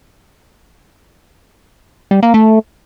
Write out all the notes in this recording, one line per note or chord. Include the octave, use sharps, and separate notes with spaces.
G3
A#3
A3